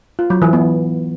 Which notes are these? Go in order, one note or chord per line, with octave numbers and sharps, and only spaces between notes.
F4
F#3
E3
B3